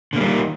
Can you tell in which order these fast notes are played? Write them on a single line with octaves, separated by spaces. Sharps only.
D3 A#3 G3 D#3